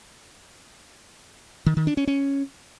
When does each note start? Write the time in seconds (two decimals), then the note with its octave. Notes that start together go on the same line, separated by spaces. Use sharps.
1.66 D#3
1.77 D#3
1.87 D4
1.97 C#4
2.07 C#4